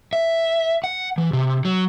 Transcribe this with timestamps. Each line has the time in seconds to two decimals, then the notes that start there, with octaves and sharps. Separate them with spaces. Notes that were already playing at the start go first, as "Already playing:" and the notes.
0.13 E5
0.84 F#5
1.18 E3
1.33 C3
1.65 F#3